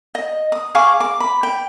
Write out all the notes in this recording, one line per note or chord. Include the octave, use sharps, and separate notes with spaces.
D#5
D#6
G#4 F5 C#6 D6
D6
B5
G5